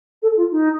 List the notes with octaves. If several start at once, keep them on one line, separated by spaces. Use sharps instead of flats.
A4
F4
D#4